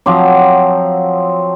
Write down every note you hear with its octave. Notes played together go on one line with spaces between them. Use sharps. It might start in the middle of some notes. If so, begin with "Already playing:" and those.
F3 F#3 C4 D6